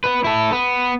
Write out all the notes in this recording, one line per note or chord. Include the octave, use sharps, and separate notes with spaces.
B3 B4
E4 A4
B3